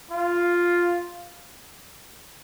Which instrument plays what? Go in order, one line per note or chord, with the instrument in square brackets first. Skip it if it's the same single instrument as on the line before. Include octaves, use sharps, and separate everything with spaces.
[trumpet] F4